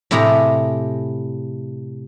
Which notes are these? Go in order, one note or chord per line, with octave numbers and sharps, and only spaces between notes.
A2 C3 E4 G4 G#4 A#5